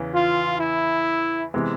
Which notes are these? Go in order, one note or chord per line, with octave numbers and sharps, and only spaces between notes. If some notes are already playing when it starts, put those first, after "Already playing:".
Already playing: E2 C#3 E3
F4
E4
C3 E3 G#3 B3